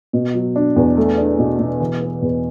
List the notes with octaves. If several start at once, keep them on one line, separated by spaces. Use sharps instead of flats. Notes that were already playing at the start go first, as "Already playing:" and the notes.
B2
F#3
D4
E2
A3
D4
B2
B2
E3
B3
E2